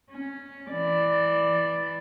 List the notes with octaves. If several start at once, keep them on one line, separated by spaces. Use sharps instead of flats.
C#4
E3 D5